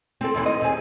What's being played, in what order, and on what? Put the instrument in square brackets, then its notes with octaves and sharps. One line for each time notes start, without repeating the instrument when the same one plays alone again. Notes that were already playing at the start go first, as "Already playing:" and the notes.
[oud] C4 A4
D#2 E3
D#5
D#2 C4 G#4